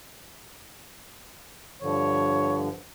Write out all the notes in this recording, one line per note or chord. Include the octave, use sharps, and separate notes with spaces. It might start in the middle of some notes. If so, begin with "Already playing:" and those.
G2 D3 F3 C#5